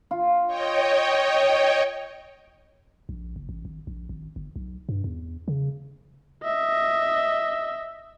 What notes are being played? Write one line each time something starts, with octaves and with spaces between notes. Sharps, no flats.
F4
C#5 D#5 G5
A#1
F#1
A1
G#1
A#1
G#1
G1
B1
G2
E2
C#3
D#5 E5